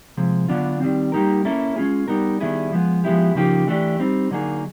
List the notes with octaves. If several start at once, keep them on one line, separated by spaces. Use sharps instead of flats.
C3 F3 G#3
D3 F#3 B3 D4 F4
D#3 G3 C4
G3 A#3 D#4 G4 A#4
A#3 C#4 E4 A4
G#3 C#4 F4 G#4
G3 B3 D#4 G4 A#4
D#3 G3 B3 E4 G#4
F3 G#3 B3
F3 G#3 B3 E4 G4
C#3 F3 A#3 D#4 G4
E3 A3 D4 G4
G3 C4 D#4
D3 F#3 A#3 D#4 G#4